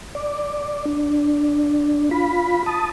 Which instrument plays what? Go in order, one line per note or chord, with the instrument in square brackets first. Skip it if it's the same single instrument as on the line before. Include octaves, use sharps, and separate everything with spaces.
[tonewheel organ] D5
D4
F4 B5
A5 D#6